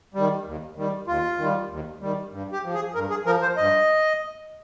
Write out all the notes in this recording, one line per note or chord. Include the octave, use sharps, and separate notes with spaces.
D#3 G3
D#2
D#3 G3
D#2 F4
D#3 G3
D#2
D#3 G3
G2
G4
F3
G#4
G2 A#4
G#4
F3 A#4
C5
G2 D#5